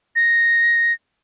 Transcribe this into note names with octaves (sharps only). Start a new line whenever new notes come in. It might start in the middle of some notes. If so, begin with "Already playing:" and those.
A#6